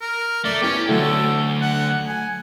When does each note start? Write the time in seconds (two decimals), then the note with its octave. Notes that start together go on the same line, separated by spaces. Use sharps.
0.01 A#4
0.44 C#2 F#2 A3 D5
0.62 B3 C#4 E4 G4
0.89 D2 F#3 A3 A4
1.62 F#5
2.07 G#5